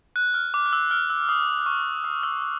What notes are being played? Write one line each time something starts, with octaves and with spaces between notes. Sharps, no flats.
F#6
F6
D6
F6
E6
F6
E6
D#6
C#6
D#6
E6
E6